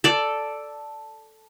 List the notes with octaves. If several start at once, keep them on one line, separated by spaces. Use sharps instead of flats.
A4 D5